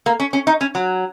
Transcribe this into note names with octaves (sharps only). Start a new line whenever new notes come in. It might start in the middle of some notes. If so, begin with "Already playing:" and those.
A#3
C#4
C#4
D#4
C#4
F#3